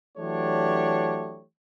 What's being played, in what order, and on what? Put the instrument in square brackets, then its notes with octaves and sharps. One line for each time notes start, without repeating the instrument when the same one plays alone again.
[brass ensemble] E3 F#3 A3 D4 G4 C#5